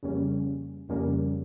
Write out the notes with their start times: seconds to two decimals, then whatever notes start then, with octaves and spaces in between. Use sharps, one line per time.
0.03 F2 C#3 G3 A#3 C#4
0.89 F2 C#3 G3 A#3 C#4